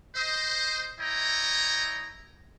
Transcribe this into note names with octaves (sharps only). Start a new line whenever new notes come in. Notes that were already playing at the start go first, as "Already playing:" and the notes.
C5 D#5
E4 C#5 D#5 G5 A#5